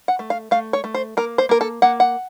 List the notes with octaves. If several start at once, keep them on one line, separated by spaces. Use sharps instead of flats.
F#5
A3
F5
A3 F5
C#5
A3
C5
A#3 A#4
C5
A#3 A#4
A4
A#3 F#5
F#5